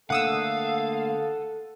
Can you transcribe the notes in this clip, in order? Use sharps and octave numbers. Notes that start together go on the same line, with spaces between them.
D3 A3 A#3 A4 F5 F#5 D#6 E6